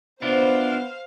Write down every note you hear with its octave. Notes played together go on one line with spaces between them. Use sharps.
B3 D4 E4 F4 C5 F5